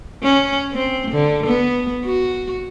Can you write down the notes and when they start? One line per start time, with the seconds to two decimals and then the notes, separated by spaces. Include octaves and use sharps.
0.23 C#4
0.74 C4
1.11 D3
1.46 B3
2.05 F#4